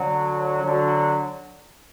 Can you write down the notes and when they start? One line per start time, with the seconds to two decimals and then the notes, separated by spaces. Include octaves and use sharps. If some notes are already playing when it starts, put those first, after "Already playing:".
Already playing: D3 F#3
0.63 D3 F#3